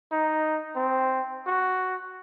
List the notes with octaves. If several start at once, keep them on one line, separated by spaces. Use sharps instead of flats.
D#4
C4
F#4